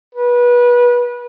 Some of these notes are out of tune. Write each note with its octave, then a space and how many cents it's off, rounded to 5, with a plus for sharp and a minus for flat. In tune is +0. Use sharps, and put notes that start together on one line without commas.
B4 -25